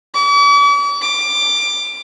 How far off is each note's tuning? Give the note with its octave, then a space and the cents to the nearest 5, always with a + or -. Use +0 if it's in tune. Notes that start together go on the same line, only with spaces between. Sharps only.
D6 -45
D6 +15